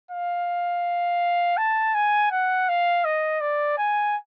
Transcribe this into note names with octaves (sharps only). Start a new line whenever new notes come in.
F5
A5
G#5
F#5
F5
D#5
D5
G#5